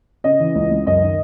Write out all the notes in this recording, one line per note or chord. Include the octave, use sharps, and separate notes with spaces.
C#3 D#5
E3
C#2
C#2
F#2 D#5
D#3